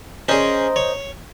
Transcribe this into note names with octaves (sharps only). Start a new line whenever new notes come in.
C#4 G#4 A#4 C5 D#5
C#5